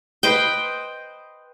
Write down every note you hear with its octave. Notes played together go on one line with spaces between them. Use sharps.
B4 C5 D#5 G5